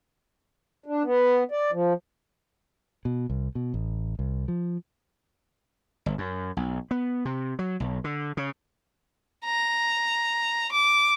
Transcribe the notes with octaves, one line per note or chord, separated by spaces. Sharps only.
D4
B3
D5
F3
B2
C2
B2
A1
C2
F3
G1
F#2
B1
B3
C3
F#3
B1
D3
C#3
A#5
D6